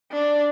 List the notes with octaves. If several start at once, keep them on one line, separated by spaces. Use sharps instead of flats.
D4